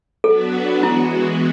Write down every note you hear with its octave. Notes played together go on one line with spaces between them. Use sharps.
F#3 B3 D4 F#4 A4 B4
E3 G#3 B3 E4 F#4